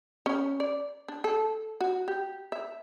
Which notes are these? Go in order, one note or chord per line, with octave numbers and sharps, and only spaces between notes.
C#4
D5
D4
A4
F#4
G4
E5